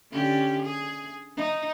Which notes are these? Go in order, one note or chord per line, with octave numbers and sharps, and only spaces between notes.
D3 C#4 G4
G#4
D#4